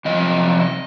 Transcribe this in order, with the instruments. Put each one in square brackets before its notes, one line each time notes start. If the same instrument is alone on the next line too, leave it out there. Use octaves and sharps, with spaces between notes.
[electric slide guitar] C3 F3 D#5